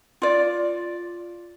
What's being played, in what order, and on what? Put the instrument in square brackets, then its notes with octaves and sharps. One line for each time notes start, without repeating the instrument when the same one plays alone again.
[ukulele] F4 D5